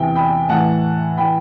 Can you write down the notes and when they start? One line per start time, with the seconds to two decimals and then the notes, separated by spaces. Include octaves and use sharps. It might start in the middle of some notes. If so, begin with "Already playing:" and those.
Already playing: E2 C3 E3 G5
0.15 G5 B5
0.49 A2 E3 F#5 A5
1.17 E3 G5 B5